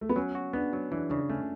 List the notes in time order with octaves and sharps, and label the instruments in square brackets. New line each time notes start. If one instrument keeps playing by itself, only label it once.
[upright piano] A3
B3
[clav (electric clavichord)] F#3 [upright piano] C#4
[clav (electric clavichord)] F#4
[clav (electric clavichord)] B3 [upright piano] D4
[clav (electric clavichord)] F#3
[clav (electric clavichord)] E3 [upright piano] D4
[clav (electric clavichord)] C#3 [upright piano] D4
[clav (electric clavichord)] A3 [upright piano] C#4